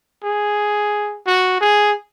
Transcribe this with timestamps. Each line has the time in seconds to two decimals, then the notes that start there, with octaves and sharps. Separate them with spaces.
0.24 G#4
1.26 F#4
1.61 G#4